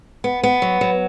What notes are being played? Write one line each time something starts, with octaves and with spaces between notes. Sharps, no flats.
B3
B3
F#3
F#3